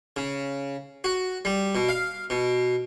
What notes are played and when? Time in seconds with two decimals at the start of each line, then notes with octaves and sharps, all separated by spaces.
0.17 C#3
1.04 F#4
1.45 G3
1.75 B2
1.89 F5
2.30 B2